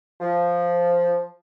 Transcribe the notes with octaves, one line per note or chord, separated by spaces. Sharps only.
F3